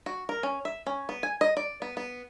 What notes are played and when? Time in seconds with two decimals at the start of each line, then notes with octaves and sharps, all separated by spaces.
0.06 F#4
0.29 A#4
0.43 C#4
0.65 E5
0.87 C#4
1.09 B3
1.23 G#5
1.41 D#5
1.57 D5
1.82 B3
1.97 B3